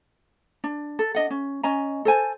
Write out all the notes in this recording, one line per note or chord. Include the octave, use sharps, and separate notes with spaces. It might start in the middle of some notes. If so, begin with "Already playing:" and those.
D4
A4
D4 D#5 F#5
C#4
C#4 D#5 G#5 A#5
A4 C5 G#5 A5